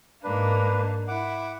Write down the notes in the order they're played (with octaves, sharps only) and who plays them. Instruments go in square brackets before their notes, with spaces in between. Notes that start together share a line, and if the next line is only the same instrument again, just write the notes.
[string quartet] G#2 A#3 [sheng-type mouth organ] D4 B4
[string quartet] E4 [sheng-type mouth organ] F#5 D6